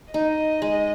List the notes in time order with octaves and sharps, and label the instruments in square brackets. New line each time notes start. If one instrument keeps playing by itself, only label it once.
[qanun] D#4 [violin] D#5
[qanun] G#3